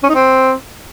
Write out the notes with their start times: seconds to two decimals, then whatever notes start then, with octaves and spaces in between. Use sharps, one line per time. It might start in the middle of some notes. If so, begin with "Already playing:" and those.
0.03 C#4
0.09 D#4
0.15 C4